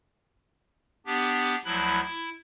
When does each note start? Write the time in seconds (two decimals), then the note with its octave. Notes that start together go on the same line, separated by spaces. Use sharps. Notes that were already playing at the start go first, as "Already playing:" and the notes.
1.06 B3 D4 G4
1.65 D2 F3 F#3 E4 B5 F#6
2.02 E4